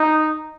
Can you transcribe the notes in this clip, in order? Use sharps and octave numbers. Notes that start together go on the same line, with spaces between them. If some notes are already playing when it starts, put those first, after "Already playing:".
Already playing: D#4